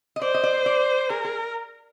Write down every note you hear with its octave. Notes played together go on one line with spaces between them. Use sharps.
D#5
C5 D5
D#5
D5
D5
G#4 A#4
G#4